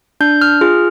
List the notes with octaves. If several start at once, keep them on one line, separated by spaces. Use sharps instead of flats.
D4 G6
F6
F4 G#4 F6